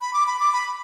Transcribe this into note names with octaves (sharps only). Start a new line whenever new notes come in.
B5
D6
B5
D6
B5